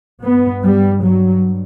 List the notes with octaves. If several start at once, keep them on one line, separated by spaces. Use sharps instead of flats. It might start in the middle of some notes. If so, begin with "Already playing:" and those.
G2 B3
G3
F#3